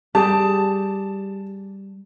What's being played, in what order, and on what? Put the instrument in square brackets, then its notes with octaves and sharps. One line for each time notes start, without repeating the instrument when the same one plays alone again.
[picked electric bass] G3 [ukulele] G4 G#4 [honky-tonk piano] A5